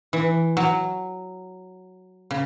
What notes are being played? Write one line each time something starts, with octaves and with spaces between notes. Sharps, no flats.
E3
F#3
C#3